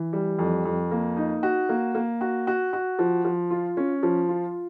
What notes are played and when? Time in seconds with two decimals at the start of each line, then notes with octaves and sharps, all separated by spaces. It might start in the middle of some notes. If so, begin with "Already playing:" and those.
Already playing: E3
0.13 G3
0.39 F2
0.65 F2
0.91 A#3
1.17 D#4
1.43 F#4
1.69 A#3
1.95 A#3
2.21 F#4
2.47 F#4
2.73 F#4
2.99 F3
3.25 F3
3.50 F4
3.77 C#4
4.03 F3
4.28 F4